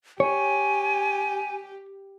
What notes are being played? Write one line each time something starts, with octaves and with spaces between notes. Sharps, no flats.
G4 C#5 G#5